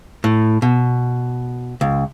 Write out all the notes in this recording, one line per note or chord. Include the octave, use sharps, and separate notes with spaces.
A2
B2
C#2